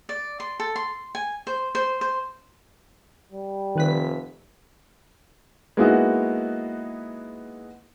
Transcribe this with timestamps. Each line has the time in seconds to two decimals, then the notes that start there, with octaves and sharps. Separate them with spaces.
0.09 D5
0.40 C6
0.60 A4
0.76 C6
1.15 G#5
1.47 C5
1.75 C5
2.01 C5
3.32 G3
3.75 F1 D#3 B4 B6
5.77 G#3 A#3 B3 D#4 E4 F#4